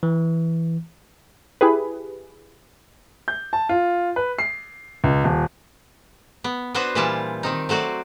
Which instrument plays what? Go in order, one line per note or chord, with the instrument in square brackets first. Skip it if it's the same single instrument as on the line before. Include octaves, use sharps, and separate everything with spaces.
[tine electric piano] E3
[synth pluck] E4 G4 G#4 B4
[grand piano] G6
A5
F4
B4
C7
C#2
D#1
[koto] B3
B3 D4 F#4 B4 C5
A#2 E3 G3 E4 F4 A5
D#3 C4 D#4
F#3 A3 F#4 C5 D5